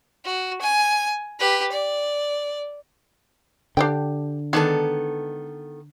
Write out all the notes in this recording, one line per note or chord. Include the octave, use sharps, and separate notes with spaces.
F#4
G#5
G4 B4
D5
D3 D4 G4 G5
D#3 G#3 B3 D4 D#4 A4